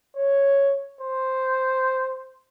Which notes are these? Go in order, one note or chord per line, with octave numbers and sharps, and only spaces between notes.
C#5
C5